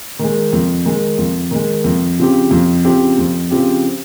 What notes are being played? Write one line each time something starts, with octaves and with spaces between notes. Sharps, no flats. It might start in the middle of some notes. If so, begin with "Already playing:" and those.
D#3 G#3
F2
D#3 G#3
F2
D#3 G#3
F2
C#3 F3 C4 G4
F2
C#3 F3 C4 G4
F2
C#3 F3 C4 G4